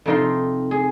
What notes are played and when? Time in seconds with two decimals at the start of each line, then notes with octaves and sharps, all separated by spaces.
0.06 F2 C3 D#4 F4 C6
0.71 G#4